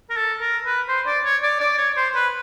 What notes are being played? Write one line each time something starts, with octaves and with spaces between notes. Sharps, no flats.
A#4
A4
A#4
B4
C5
D5
C#5
D5
D5
C#5
C5
B4